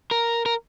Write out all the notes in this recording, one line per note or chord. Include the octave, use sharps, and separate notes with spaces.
A#4
A#4